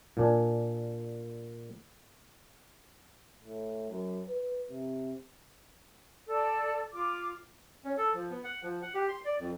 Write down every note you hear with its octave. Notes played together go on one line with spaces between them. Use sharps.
A#2 D4 G#5
A2
F#2
B4
C3
A4 D5
F4 D6
C#4
A4
F3
B3
F#5
F3
F#5
G4
C6
D5
F2